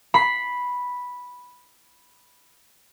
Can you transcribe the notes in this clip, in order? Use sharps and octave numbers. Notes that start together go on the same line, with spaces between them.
B5 C7